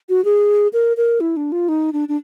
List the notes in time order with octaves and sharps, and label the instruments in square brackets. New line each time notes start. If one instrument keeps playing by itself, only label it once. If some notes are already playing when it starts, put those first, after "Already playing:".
[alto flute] F#4
G#4
A#4
A#4
E4
D4
F4
D#4
D4
D4